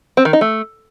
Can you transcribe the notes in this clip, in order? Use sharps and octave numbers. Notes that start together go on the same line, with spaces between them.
C4
D#3
D#4
A3